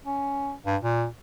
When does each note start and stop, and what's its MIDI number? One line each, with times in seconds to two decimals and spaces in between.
0.05 0.53 61
0.66 0.77 43
0.82 1.06 46